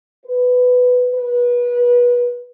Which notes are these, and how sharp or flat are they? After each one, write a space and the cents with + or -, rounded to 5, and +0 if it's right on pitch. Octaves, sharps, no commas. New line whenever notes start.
B4 +10
B4 -25